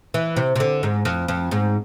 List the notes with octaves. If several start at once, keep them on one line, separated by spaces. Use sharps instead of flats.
E3
C3
C3
D3
G#2
F2
F2
G#2